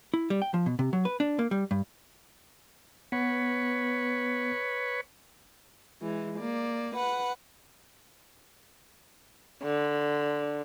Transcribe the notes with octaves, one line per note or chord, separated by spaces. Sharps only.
E4
G3
G5
F3
B2
C3
F#3
B4
D4
A#3
G3
G2
B3 B4 C#5
E3 G#3
A#3 D5
B4 F#5
D3